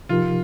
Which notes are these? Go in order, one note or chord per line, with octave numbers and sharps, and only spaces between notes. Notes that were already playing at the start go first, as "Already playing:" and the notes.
C3 F3 D#4 F4 G4 A#4